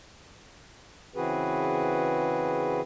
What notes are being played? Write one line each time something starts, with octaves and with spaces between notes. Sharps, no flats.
C#3 E3 C4 F#4 G#4 B4